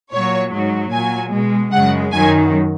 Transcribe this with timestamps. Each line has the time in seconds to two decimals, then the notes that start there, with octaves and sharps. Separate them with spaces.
0.11 A#2 F#3 C#5
0.51 G#2 F#3
0.91 A#2 F#3 G#5
1.32 B2 G#3
1.72 F#2 C#3 G#3 F#5
2.12 F#2 D#3 F#3 G#5